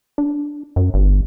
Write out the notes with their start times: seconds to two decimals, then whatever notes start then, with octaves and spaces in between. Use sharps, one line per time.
0.18 D4
0.76 F#2
0.94 G1